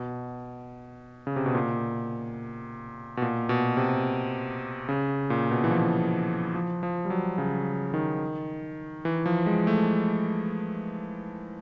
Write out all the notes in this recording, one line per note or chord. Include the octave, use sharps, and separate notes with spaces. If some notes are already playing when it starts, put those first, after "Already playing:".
Already playing: B2
C#3
C3
B2
A#2
B2
A#2
B2
C3
C#3
A#2
B2
E3
F3
F3
F3
G3
F#3
C#3
D#3
E3
F3
G#3
A3